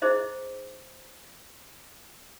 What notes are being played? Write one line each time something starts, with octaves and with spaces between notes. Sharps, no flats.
D#4 E4 G#4 C5 D#5